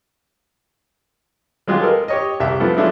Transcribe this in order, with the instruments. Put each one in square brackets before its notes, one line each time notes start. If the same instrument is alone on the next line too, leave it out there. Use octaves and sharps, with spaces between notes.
[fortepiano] F#3 G#3 F4 G4
A4 A#4 D#5
G4 C#5 D#5
C2 G4 E5
F3 A3 B3 E4
F3 F#3 G#3 A3 D4 E4